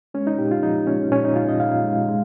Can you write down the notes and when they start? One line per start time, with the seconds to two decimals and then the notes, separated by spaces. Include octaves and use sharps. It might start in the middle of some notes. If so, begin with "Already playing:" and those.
0.14 G#3 C#4
0.27 D#4
0.38 A#2 G4
0.51 F4
0.63 F3 D#4
0.87 G#3 C#4
1.11 A#2 C#4
1.24 D#4
1.36 A#2 F4
1.49 D#5
1.60 A#2 F5
1.84 G#3
2.08 G#3